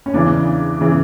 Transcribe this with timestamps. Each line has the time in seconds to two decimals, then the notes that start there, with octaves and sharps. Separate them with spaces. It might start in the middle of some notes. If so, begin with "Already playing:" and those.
0.06 C#4
0.14 E2 C#3 E3 D4
0.81 C#3 E3